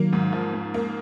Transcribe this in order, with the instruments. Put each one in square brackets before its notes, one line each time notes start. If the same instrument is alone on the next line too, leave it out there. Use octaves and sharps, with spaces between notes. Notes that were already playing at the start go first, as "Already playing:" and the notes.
Already playing: [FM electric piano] D#3 F#3 [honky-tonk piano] A#3
[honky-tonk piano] G#2
F3
G#2
A#3